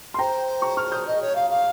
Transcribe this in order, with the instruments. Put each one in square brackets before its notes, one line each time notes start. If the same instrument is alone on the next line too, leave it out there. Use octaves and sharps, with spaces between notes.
[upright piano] C6
[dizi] C5 [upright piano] G5 A#5
[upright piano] A#5 C#6
C#6 F6
D#6 G6
[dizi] D#5
C#5
F5
F5